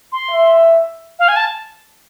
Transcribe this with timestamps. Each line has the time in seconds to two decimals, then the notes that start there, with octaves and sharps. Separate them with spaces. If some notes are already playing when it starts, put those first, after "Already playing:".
0.12 C6
0.31 E5
1.19 F5
1.28 G#5
1.36 A5